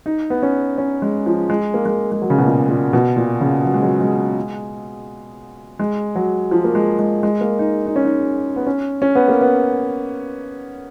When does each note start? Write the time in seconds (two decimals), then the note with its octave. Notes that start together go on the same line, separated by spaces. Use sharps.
0.06 D#4
0.30 B3
0.43 C#4
0.78 C#4
1.02 G#3
1.26 F3
1.50 G#3
1.74 A#3
1.85 G#3
2.12 G#3
2.22 F#3
2.30 C#3
2.38 B2
2.45 A#2
2.69 A#2
2.93 B2
3.16 A#2
3.41 C#3
3.65 F#3
3.74 G#3
3.83 F#3
4.01 G#3
5.79 G#3
6.15 F#3
6.51 F3
6.64 A#3
6.75 G#3
6.99 G#3
7.23 G#3
7.41 A#3
7.59 D#4
7.86 D#4
7.96 C#4
8.05 D#4
8.56 B3
8.67 C#4
9.02 C#4
9.15 B3
9.28 A#3
9.41 B3